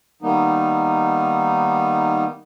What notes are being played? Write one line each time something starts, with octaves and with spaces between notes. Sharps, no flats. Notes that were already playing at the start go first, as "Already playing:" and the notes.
D#3 G3 A#3 B3 D#4